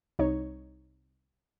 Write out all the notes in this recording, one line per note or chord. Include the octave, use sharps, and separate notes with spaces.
C2 D#4 C#5